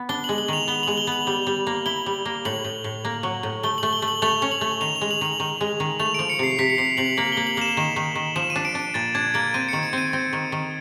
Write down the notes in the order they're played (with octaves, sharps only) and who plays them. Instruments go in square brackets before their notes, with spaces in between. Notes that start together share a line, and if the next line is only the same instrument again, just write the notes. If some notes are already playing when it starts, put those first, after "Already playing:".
Already playing: [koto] B3
[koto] D4 [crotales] G7
[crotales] F#7
[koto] G#3
[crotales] F#7
[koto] D#3 [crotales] F7
[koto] B3 [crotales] G7
[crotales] F#7
[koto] G#3
[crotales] G7
[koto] B3 [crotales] F#7
[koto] G3
G3
A#3
[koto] E4 [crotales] G7
[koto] G3
A#3
[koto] A2 [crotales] F#7
[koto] A2
A2
A#3
F#3
A2
[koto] A3 [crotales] G7
[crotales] F#7
[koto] A3
[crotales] G7
[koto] A3
[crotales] F#7
[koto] A3 [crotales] F7
[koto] C#4
[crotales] F#7
[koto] A3
[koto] D#3 [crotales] F7
[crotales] F7
[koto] G#3
[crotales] F#7
[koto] D#3 [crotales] F#7
[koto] D#3
G#3
D#3
[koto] A3 [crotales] F7
[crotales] D7
[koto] F3
[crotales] C#7
[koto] C3 [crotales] C7
[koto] C3 [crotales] B6
[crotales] C#7
[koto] C3 [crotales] C7
[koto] C3 [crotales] F#7
[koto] A#3 [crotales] F#7
[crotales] G7
[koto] A#3
[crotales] F#7
[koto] A#3 [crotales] E7
[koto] D#3
D#3
D#3
[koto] F3 [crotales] E7
[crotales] D#7
[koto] D4
[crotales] D7
[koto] D4 [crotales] D7
[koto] A#2 [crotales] A6
[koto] D4 [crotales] G#6
[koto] A#3 [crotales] D7
[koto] C4 [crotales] D#7
[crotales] C#7
[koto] D#3
[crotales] D7
[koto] C4 [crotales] D#7
[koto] C4
D#3
D#3